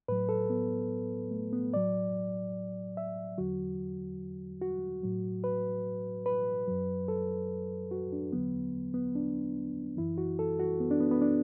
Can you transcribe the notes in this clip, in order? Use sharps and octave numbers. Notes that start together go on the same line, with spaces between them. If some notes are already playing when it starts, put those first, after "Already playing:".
A2 F#3 B4
A4
B3
A3
B3
A2 F#3 D5
E5
E2 D3 F#3 F#4
F#4
A2 F#3
B4
B4
F#2 F#3
A4
F#4
D4
E2 D3 F#3 B3
B3
D4
F#2 E3 E4
F#4
A4
F#4
B3
D4
B3
B3
D4